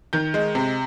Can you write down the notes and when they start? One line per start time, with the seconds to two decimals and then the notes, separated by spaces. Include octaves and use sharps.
0.13 D#3 G6
0.34 G#3
0.55 C3